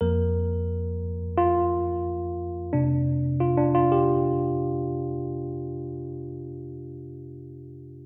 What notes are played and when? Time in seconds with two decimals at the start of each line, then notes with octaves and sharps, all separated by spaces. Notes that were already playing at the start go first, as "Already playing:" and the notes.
0.01 F2 F3 A#3 A#4
1.38 F4
2.73 F2 C3 A#3 D4
3.40 F4
3.58 D4
3.75 F4
3.92 G4